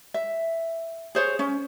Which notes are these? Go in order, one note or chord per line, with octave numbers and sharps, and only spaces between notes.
E5
G#4 C5 C#5
C#4